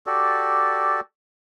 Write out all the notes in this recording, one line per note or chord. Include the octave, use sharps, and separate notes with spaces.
F#4 G4 A4 D5